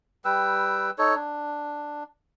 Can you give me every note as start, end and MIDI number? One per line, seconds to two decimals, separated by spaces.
0.25 0.90 55
0.25 0.90 71
0.25 0.90 79
0.25 0.90 88
0.98 1.15 63
0.98 1.15 69
0.98 1.15 73
1.16 2.03 62